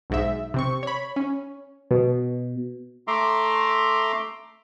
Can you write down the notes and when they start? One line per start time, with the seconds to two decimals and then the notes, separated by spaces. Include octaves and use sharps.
0.10 B1 G#2 E5
0.54 C3 C4 C#6
0.83 C#5 B5
1.16 C#4
1.91 B2
3.08 A3 E5 A#5 C6 D6